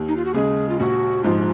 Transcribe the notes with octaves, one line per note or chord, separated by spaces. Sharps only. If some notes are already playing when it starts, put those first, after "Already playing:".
Already playing: D#2
D#4
F4
F#4
C#3 G#3 G#4
F4
A#1 F#4
G#2 F3 F4